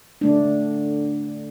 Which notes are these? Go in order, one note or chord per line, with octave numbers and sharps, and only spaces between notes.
D3 A3 D4